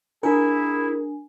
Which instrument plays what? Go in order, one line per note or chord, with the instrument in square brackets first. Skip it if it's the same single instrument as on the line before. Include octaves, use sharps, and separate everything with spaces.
[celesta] D4 G#5 [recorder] E4 [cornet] G#4 [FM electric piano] A#4